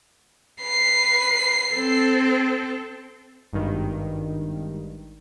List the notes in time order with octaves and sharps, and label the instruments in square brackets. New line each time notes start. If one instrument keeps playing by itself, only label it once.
[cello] B4 [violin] C7
[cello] C4 A4
[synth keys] G#1 G2 D#3